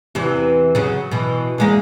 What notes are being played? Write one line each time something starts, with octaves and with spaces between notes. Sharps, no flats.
E2 C3 E3
C#3 F#3
B2 E3
E2 G#3 A#3